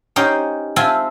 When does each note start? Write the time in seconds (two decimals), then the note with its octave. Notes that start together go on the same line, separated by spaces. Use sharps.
0.16 C#4 D#4 G4 C5
0.76 C4 F4 E5 G#5 A5